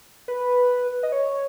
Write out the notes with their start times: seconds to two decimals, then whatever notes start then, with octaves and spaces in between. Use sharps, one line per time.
0.28 B4
1.03 D#5
1.12 C#5